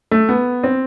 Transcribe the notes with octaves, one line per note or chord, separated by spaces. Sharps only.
A3
B3
C4